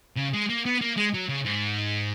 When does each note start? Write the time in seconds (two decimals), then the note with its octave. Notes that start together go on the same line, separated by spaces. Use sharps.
0.16 C#3
0.33 G#3
0.49 A#3
0.66 B3
0.81 A#3
0.97 G#3
1.14 F#3
1.28 C#3
1.45 G#2